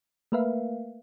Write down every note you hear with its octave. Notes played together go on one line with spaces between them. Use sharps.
A3 A#3 A#4 B4 E5 F5